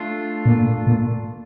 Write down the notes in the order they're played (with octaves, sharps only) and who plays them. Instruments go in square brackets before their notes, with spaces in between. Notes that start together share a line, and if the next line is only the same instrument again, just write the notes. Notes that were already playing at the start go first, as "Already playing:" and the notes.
Already playing: [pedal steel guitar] A3 D4 F4
[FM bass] A#2
A#2